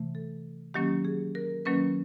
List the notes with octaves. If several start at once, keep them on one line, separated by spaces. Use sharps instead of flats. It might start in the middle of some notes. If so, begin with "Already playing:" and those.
Already playing: C3 E3 A3
A4
D#3 F#3 A#3 C#4 G4
G#4
A#4
D#3 F#3 A#3 C#4 B4